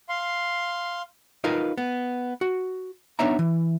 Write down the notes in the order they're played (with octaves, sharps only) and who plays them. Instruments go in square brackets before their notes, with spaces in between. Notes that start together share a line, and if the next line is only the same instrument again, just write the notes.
[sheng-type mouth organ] F5 C6
[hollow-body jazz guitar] D#4 F4 A#4 B4 F5
B3
F#4
B3 D4 D#4 C#5 E5 A#5
E3